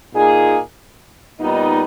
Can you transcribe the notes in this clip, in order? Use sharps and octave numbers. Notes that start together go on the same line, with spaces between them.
A#2 A#3 D#4 G#4
A#2 G3 B3 D#4